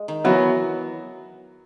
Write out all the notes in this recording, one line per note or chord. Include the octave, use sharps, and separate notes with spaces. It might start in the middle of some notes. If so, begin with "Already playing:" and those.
Already playing: G#3
D#3
E3 F#3 B3 F#4